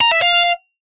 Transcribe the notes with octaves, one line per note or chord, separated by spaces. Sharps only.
A#5
E5
F5